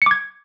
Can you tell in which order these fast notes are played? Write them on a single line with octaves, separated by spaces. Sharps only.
C#7 D6 G#6